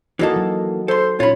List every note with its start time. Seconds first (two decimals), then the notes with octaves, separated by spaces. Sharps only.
0.19 E3 A#3 D#4 F#4 A4 D#5
0.36 F#3
0.88 A4 C5 C6
1.20 A#2 C#4 D#4 F4 C#5 B5